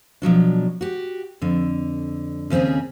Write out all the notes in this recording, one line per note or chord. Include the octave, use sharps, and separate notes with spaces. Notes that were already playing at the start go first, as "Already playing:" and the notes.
B2 F3 F#3 D4
F#4 G4
F2 D3
D#2 C#3 C4 C#4 G#4